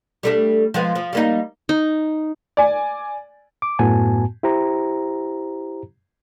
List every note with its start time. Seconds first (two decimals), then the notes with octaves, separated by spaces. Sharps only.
0.23 G3 A3 D4
0.74 F3 G#3 B3
0.95 F3
1.13 G3 A#3 D#4
1.69 D#4
2.57 D5 G#5
3.62 D6
3.79 F#2 A2 B3 F#4 G#5 A5
4.43 E4 G4 C5 A#5